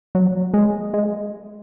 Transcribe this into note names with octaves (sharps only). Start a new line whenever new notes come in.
F#3
G#3
G#3